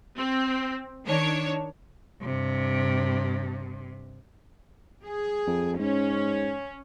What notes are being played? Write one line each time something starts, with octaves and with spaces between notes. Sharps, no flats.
C4
D#3 D4 C#5
G2 C3
G#4
F2
G#2 C#4